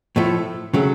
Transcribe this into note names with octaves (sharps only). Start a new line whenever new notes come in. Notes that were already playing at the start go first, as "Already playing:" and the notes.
A2 F3 A3
C#3 F#3 A3